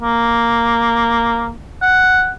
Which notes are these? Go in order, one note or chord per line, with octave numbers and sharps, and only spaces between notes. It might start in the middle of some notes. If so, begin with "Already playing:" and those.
A#3
F#5